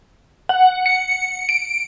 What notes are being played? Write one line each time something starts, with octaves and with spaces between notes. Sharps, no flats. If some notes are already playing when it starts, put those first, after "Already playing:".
F#5
C#7
D7